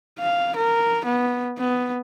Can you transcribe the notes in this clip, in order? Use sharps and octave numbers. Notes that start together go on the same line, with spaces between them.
F5
A#4
B3
B3